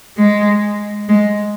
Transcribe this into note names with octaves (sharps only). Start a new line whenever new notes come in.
G#3
G#3